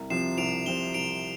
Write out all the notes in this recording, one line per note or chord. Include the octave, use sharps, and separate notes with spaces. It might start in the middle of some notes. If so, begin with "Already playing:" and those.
Already playing: C2
C3 F3 C4 C7 E7
C2 D7 F7
C3 F3 C4 E7 G7
C2 D7 F7